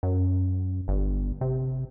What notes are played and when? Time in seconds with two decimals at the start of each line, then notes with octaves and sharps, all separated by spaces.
0.03 F#2
0.88 G1
1.41 C3